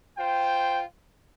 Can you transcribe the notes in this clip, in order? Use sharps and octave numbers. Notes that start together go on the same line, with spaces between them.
F4 C5 G5